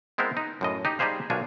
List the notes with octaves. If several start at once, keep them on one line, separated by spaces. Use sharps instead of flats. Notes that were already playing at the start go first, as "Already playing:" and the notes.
G#3 B3 C4 E4 A#4 C5
D#4
F#2 A2 D#5
D#4 G4
G3 D#4 G4 G#4 C5 F5
B1 A#2 D4 F4 F#4 G#5